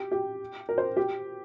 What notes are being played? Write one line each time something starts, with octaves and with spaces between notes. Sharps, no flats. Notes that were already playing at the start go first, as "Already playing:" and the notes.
Already playing: G4
G4
A#4
C5
G4